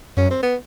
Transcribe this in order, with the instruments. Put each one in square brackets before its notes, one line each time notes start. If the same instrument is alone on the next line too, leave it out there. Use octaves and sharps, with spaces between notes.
[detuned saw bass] F#2 [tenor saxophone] C#4
[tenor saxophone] C4
B3